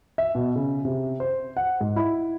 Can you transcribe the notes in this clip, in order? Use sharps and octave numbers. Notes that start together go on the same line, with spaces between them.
E5
B2
C#3
C3
C5
F#5
G#2
E4